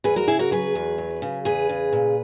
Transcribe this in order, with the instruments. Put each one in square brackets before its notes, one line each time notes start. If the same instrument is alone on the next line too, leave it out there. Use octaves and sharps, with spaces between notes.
[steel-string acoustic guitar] E2 G#4 B4
F#4 A#4
C#3 E4 G#4
F#4 A#4
F#3 G#4 B4
E2
F#3
C#3
E2 G#4 B4
C#3
A#2